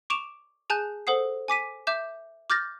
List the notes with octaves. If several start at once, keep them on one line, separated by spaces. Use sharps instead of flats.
C#6 D6 D7 E7 F7
G#4 G#5 A5 F#6 G6
A4 C5 F#5 D#6 C7
G#5 D6 B6 D#7
E5 D6 G6 E7
D6 F6 G6 A6 A#6